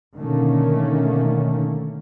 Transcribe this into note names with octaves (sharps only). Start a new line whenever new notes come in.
B2 D3 D#3 A3 A#3 C#4